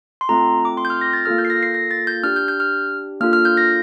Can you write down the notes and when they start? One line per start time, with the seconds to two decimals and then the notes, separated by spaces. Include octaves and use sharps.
0.21 C6
0.29 A3 C4 F4 A4 A#5
0.65 D6
0.77 C6
0.85 G6
0.90 F6
1.01 A#6
1.13 A6
1.25 A#3 F4 A4 F6
1.38 G6
1.45 C7
1.50 A#6
1.63 C7
1.74 A#6
1.91 A6
2.07 G6
2.24 D4 G4 F6
2.36 G6
2.48 G6
2.60 F6
3.21 A#3 D4 F4 A4 F6
3.33 F6
3.45 G6
3.57 A#6